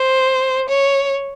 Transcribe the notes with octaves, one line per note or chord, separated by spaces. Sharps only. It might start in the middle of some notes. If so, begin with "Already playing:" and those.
Already playing: C5
C#5